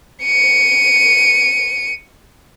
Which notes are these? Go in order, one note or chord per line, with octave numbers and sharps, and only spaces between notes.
C#7 D#7